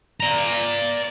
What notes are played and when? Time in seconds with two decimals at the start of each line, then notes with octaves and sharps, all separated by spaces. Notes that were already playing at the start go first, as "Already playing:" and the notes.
0.20 D5 A#5